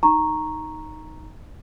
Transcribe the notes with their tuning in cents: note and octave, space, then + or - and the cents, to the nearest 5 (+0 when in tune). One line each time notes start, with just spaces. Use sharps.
D#4 +0 A#5 +0 C#6 -10